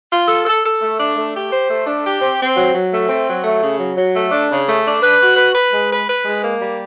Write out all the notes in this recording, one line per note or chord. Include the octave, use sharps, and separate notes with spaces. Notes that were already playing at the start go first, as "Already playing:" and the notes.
F4
A4
A4
A4
A3
D4
A3
G4
C5
A3
D4
G4
C4
C4
F#3
F#3
A3
C4
F#3
A3
C#3
F#3
F#3
A3
D4
C#3
A3
D4
B4
F#4
B4
B4
G#3
B4
B4
G#3
A#3
G3